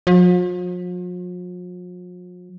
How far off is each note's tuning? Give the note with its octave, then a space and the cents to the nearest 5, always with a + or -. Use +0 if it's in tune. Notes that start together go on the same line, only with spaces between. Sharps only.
F3 +45